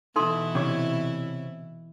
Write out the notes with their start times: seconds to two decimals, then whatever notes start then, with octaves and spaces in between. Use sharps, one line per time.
0.16 B2 E3 D#4 E4 A4 C6
0.55 C3 C#5